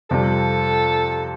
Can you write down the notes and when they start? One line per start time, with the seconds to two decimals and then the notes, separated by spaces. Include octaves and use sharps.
0.10 F2 C3 G3 A4